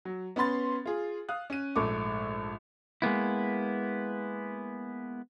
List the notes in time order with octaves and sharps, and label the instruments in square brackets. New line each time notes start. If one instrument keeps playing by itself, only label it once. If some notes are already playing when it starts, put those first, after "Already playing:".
[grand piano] F#3
B3 C#4 B5 C6 A6
F4 G#4
F5 D#6 F#6
C#4 D#7
A#1 G#2 A3 A4 C#6 D6
[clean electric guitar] G#3 A#3 B3 E4